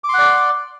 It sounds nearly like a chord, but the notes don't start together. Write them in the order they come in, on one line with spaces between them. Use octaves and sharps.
D6 C6 F#5 D5